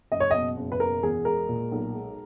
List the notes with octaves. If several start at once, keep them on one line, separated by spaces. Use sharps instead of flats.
F#1 D#5
C#5
B2 D#5
F#1
B4
B2 A#4
E2 G#4
G#3 A#4
A#2
B1
G#3